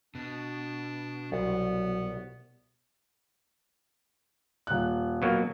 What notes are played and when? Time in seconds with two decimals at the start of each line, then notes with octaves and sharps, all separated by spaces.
0.15 B2 D4
1.32 C2 F#3 B3
4.67 D#1 F#6
5.22 B2 F#3 A#3